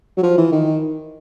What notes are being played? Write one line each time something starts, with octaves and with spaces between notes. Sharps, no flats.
F#3
F3
E3
D#3